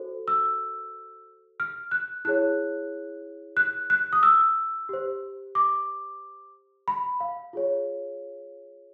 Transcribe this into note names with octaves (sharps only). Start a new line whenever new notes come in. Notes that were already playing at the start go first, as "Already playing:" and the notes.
Already playing: F#4 A4 C5
E6
F6
F#6
E4 G#4 C#5 F#6
F#6
F#6
D#6
E6
G4 C5
D6
B5
F5
F4 G#4 C#5